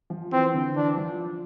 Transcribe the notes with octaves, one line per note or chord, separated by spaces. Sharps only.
F3
E3 C4
D3
E3 D4
F3